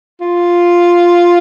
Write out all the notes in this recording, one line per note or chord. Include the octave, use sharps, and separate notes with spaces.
F4